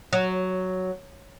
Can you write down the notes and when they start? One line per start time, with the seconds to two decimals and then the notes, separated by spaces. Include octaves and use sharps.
0.13 F#3